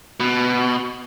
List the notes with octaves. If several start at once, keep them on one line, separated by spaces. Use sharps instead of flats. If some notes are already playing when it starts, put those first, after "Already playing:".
B2